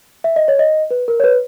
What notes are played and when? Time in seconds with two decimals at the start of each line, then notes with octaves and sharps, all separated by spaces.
0.24 E5
0.36 D#5
0.48 C#5
0.59 D#5
0.91 B4
1.08 A#4
1.20 C#5
1.24 B4